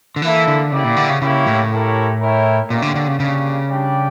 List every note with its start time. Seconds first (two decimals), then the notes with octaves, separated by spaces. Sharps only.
0.16 D3
0.22 E3 A#3 E4 A4 E5
0.47 D3
0.72 C#3 A#3 E4 G4 D5
0.84 A#2
0.97 D3
1.09 C#3
1.22 C#3 A#3 E4 G4 C#5
1.47 A2
1.71 A3 E4 G4 A#4 C#5
2.21 E4 A#4 C#5 E5 G5
2.70 A#2 A#3 C#4 G4 D5
2.82 D3
2.95 D3
3.07 C#3
3.20 C#3 A#3 D4 G4
3.70 G3 D4 G4 D5 G5